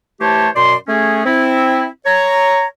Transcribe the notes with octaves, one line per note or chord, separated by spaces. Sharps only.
E3 A3 G4 C5 C#5 A5
F#2 B2 D5 C6
A3 C#4 G#4
C4 E4
C#5 A#5